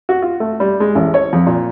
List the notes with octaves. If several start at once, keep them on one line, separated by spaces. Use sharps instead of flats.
F#4
F4
A3
G3
G#3
A1
C#5
F2
A#2